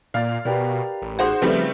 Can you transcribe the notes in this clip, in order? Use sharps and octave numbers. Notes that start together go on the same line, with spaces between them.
A#2 D5 F5 A6
B2 G4 A#4 B4 D5
A1
D#4 F#4 G#4 C5
C#3 F3 G3 A3 C4 B4 E5